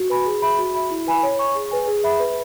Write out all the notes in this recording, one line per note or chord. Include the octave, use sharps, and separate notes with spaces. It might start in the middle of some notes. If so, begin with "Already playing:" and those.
Already playing: F#4
B4 G#5 B5
G#4
E5 B5
F#4
E5 B5
E4
B4 G#5 B5
C#5
G#5 C#6
G#4
B4 G#5
G#4
E5 B5
B4